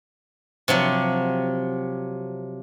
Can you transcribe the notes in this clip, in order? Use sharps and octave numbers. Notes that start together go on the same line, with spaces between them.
C3 F3 F#3